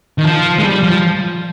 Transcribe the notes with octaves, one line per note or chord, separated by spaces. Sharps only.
D#3
F3
G#3
G3
F3